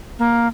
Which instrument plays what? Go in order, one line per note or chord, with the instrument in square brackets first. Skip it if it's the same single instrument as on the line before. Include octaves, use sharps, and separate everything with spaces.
[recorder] A#3